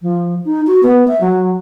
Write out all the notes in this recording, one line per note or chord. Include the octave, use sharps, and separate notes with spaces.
F3
D#4
F#4
B3
E5
F#3